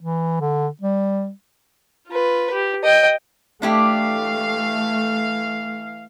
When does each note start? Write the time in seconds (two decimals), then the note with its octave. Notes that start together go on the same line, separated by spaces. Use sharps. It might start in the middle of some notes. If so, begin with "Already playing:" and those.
0.01 E3
0.41 D3
0.81 G3
2.08 F4 B4
2.52 G4
2.84 D#5 G5
3.62 E3 A3 D4 E4 G4 F5